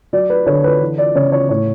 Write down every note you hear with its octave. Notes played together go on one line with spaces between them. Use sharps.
F#3 D5
B4
D3 C#5
B4
E3
D5
C#3 C#5
C#5
A2 C#5